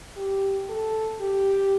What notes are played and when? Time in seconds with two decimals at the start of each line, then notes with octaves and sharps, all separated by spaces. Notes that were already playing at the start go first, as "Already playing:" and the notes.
0.16 G4
0.69 A4
1.20 G4